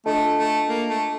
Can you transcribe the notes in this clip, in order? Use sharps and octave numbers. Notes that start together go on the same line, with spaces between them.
A3 D4 F4 A4 D#5 A5
A3
A#3
A3